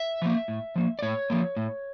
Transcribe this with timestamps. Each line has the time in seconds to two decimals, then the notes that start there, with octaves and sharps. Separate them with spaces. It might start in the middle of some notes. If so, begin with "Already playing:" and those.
Already playing: E5
0.22 F3 A#3
0.48 A2
0.76 F3 A#3
0.99 D5
1.02 A2 C#5
1.30 F3 A#3
1.57 A2